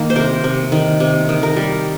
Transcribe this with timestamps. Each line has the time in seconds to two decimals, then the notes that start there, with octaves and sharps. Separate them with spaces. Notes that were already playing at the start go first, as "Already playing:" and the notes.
Already playing: D#3 A#3
0.10 C5
0.16 C3 A#4
0.44 C3
0.72 D#3
1.00 C3
1.29 D#3
1.43 A#4
1.57 G3